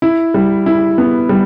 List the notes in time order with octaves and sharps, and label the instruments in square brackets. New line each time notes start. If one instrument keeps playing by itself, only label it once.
[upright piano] E4
G3
E4
B3
G3